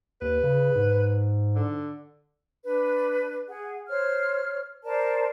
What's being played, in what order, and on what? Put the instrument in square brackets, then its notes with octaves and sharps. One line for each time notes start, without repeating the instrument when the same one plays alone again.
[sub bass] D#2 [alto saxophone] B4
[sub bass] C#3
G#2
[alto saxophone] D3
[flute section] D4 B4
G#4 F#5
C5 C#5 F6
A#4 C5 D5 A5